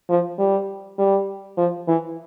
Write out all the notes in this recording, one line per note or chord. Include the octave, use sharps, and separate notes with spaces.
F3
G3
G3
F3
E3